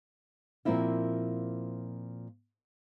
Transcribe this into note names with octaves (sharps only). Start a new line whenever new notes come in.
A#2 F3 A#3 C4 E4 F4